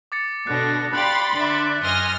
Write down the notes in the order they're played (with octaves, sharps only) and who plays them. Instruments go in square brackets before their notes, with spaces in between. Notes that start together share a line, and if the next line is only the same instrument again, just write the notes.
[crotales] D6 A6 C#7
[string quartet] B2 A#6 [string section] D3 D4 [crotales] F#6
[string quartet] G4 D5 F5 [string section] B5 C6 A6 [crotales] F#6
[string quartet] D3 D5 E5
[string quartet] F#2 D#5 G#5 [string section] C6 F6 A#6